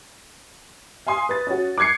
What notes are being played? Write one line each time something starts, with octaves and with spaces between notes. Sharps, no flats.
F5 G#5 C6 D#6
B4 A6
C#4 F#4
D6 F#6 G#6 C7 C#7